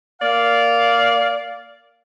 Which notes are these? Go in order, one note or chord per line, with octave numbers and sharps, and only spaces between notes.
A#3 D5 F5